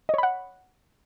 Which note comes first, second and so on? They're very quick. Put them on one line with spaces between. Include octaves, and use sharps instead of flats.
D#5 C#5 B5 F#5